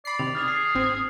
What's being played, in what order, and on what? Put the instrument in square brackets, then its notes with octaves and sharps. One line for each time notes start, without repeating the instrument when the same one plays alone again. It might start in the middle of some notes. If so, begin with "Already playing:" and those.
[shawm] D5 [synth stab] B5 C7
[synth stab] C3 D#3 [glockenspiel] F7
[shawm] G#4 [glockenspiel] F6 A6 F7
[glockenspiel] C7
[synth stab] G#1 C4